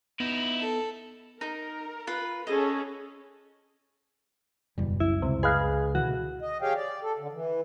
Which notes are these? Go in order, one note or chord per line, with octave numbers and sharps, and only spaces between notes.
B3 D#4 E4
A4
D#4 A#4
F4 B4
C#4 G#4 A4 D#5
F#1 E2 B2 G3
C2 F#2 E4
C#2 C3
G#4 B4 D#5 F5
B2 D3 E3 F#4
D#5
G4 G#4 C#5 F5 G5
D5
A4
D3
E3